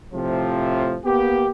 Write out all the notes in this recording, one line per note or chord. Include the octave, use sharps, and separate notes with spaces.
A2 C3 F3
A#3 B3 G4